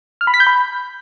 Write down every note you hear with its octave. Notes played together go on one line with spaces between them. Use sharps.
F6
B5
B6
G6
B5